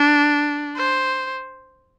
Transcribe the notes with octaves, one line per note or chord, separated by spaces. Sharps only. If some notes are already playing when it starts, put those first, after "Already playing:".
Already playing: D4
C5